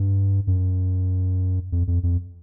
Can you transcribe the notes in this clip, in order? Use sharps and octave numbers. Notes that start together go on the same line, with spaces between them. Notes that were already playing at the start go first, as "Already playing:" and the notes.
Already playing: G2
F#2
F2
F2
F2